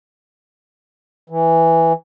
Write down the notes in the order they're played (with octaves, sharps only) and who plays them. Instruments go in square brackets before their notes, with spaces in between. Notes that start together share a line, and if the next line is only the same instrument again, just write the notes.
[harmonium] E3